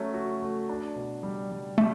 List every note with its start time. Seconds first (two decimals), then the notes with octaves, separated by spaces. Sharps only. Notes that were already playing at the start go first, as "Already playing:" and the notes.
Already playing: F#3 A3 C#4
0.14 F#4
0.42 A3
0.69 D4
0.96 B2
1.23 G3
1.51 G3
1.78 G3 A3